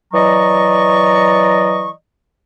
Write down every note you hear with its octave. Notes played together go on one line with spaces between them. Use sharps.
E3 F#3 D5 D#5 A#5 C#6